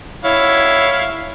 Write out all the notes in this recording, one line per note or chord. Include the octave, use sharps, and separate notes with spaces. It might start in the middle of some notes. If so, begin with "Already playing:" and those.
E4 C#5 F5